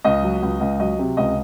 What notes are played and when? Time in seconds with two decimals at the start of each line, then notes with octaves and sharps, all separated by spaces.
0.04 C#2 D#5
0.23 F#3
0.42 C#2
0.60 C#2
0.80 F#3 D#5
0.99 C3
1.17 C#2 D#5